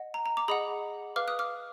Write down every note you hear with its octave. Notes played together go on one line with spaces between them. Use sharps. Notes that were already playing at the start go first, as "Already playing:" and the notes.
Already playing: D#5 F#5
A#5
A#5
A#5 D6
G#4 D#5 F#5 B5 D#6
B4 F5 D6 F6
D#6 F#6
D6 F6